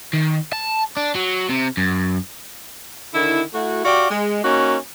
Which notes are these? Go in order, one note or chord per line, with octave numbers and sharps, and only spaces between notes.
D#3
A5
D4
F#3
C3
F#2
D3 D#3 E4
A3 E4 F#4
F#4 G4 D5 F5
G#3
A#3 C#4 D#4 F#4